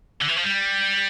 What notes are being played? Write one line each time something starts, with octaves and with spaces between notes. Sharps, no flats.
D3
E3
F3
G3